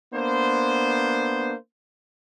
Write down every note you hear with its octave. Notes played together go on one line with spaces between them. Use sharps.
A#3 B3 D4 C5